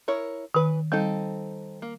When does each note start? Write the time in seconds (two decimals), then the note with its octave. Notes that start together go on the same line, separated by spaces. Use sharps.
0.08 E4 A#4 C#5
0.55 D#3 E3 B4
0.92 G3 C4 D#4 A4
1.82 A#3